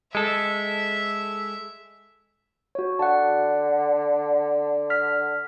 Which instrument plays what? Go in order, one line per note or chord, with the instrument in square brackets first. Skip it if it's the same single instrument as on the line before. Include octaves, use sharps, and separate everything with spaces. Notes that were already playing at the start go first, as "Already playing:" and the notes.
[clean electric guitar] G#3 A4 [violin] E5
[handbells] F#4 C#5
[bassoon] D3 [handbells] F#5 A5
[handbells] F6 B6